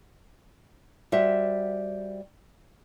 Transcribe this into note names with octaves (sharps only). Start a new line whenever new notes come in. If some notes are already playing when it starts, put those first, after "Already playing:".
G3 F#4 C5 E5